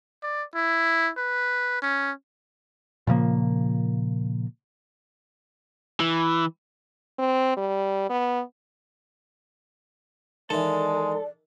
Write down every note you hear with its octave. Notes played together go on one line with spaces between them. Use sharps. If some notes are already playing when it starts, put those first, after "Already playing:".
D5
E4
B4
C#4
A#2 C#3 F3 A#3
E3
C4
G3
B3
D#3 E3 G#3 A4 D5